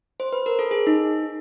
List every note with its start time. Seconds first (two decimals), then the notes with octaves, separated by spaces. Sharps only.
0.20 C5
0.33 B4
0.46 A#4
0.59 A4
0.71 G#4
0.87 D#4